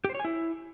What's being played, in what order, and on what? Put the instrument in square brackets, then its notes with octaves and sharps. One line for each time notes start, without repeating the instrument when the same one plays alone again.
[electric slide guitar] G4
C5
C#5
G#5
E4